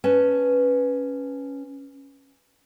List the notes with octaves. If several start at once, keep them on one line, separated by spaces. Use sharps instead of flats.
C#4 B4 A5